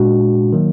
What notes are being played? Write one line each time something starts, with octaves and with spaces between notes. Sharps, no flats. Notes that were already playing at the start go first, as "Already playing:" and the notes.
Already playing: A#2 G#3 D4 F#4
D#3 F#3 A#3